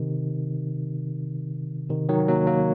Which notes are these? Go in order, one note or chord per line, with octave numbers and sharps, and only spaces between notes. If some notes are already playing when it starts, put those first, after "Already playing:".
Already playing: C3 D#3
C3 D#3
D#3 F#3
F#3 A#3
F#3 A#3